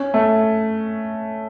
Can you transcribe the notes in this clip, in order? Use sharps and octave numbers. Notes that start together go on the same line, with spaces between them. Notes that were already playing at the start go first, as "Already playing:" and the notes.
Already playing: C#4
A3